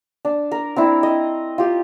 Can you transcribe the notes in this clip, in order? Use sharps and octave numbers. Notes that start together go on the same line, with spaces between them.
D4
A#4
C4 D4 E4
D#5
F4 G4